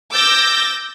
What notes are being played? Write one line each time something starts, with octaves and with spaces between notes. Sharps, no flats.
D6 E6 G6 A6 A#6